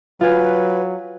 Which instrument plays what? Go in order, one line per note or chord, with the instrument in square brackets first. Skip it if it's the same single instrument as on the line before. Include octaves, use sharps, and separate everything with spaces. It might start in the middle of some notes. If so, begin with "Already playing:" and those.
[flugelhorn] F#3 [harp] F4 G#5 [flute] B4